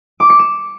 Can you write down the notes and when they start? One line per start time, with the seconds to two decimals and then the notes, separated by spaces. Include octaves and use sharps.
0.20 D6
0.30 C#7
0.39 E7